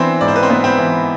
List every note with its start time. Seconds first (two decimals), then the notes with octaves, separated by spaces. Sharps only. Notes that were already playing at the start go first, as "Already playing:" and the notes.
Already playing: E3 B3 C4 D4 C5
0.21 G#2 D5
0.28 C5
0.36 B4
0.43 C4 C5
0.50 B3
0.64 C4 C5
0.78 E3